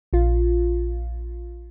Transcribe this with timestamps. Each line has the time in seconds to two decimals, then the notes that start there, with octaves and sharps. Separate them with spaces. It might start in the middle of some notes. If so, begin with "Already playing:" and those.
0.13 A#1 F4